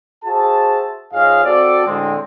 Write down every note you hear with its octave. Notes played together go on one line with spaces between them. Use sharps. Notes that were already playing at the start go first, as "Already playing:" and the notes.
F#4 G#4 C5 E5 A5
G#2 F4 G#4 C#5 D#5 F5
C4 F#4 A4 D5
A2 D3 G#3 C4